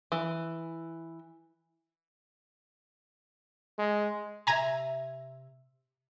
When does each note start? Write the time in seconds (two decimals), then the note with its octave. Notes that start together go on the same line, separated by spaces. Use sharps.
0.12 E3
3.78 G#3
4.47 C3 E5 G#5 A#5 G#6